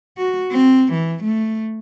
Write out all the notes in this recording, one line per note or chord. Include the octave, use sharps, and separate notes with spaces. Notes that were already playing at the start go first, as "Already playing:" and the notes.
F#4
C4
E3
A3